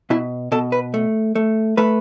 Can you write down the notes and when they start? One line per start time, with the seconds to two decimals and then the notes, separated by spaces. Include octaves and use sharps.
0.10 B2 E4
0.52 B2 A4
0.72 B4
0.94 A3
1.35 A3
1.77 A3 B4